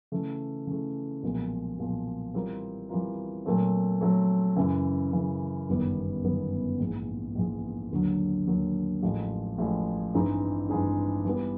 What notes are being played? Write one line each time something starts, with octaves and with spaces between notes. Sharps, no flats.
C#3 E3 A3
C#3 E3 A3
B1 A#2 F3 G#3
B1 A#2 F3 G#3
E3 G3 C4 F4 A#4
E3 G3 C4 F4 A#4
A#2 F#3 A3 C4
A#2 F#3 A3 C4
F#2 C#3 E3
F#2 C#3 E3
G1 F#2 D#3 G3 B3
G1 F#2 D#3 G3 B3
A#1 G#2 E3 G#3
A#1 G#2 E3 G#3
D#2 D3 F#3
D#2 D3 F#3
A1 A2 F3 G#3
A1 A2 F3 G#3
G2 E3 G#3 C4 D#4
G2 E3 G#3 C4 D#4
E3 G3 B3